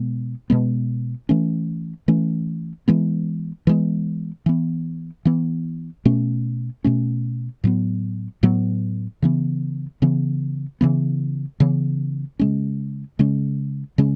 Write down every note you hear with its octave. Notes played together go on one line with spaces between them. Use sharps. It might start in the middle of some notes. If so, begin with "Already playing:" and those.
Already playing: B2 G#3 B3
B2 G#3 B3
E3 A3 C#4
E3 A3 C#4
E3 G#3 B3
E3 G#3 B3
E3 B3
E3 B3
B2 A3 C#4
B2 A3 C#4
A2 F#3 B3
A2 F#3 B3
C#3 E3 B3
C#3 E3 B3
C#3 E3 B3
C#3 E3 B3
C#3 G#3 C#4
C#3 G#3 C#4
C#3 G#3 C#4